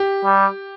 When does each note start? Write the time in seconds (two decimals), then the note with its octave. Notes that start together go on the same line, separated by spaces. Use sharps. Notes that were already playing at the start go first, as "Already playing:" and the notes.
Already playing: G4
0.25 G3